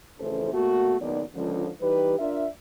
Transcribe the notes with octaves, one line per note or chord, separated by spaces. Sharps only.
A1 F2 C#3 E3 A4 C5
B2 A3 A#3 F#4
F#1 B1 D#3 B3 D5
C#2 D3 F3
E3 G3 D#4 G4 B4
D4 F4 A#4 D5 E5